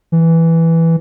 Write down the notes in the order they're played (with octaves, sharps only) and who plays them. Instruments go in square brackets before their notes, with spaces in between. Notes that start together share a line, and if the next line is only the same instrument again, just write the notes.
[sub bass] E3